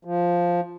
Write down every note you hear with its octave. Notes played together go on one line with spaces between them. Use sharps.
F3